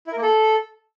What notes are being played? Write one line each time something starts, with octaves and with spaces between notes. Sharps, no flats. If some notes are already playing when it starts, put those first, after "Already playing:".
E4
A#4
A#3
A4